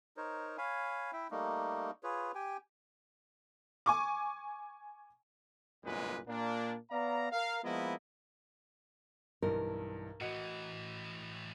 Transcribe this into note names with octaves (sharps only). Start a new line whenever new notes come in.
D#4 A#4 C5 C#5
C#5 F5 G#5 B5
E4 E5 G5
G3 A3 A#3 D#4
F4 G#4 B4 C#5
G4 G5 G#5
G#5 C#6 D6
G1 C2 F#2 A#2 G#3 B4
A#2 A#3 D4
B3 D5 F5 A#5
A#4 F5
F3 G#3 A#3 B3 E4 D#5
B1 G2 E3 A#4
A2 E3 F#4 D#5 C#7